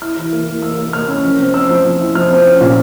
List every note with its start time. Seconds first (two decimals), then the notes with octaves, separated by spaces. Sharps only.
0.02 E4 F6
0.17 E3
0.33 A#3
0.47 E3
0.62 A#3 E6
0.78 A#3
0.93 A#3 F6
1.08 C#4
1.24 F3
1.39 C4
1.54 C4 E6
1.69 F3
1.85 F3
2.00 E4
2.15 F3 F6
2.30 C4
2.46 C#4
2.61 A#2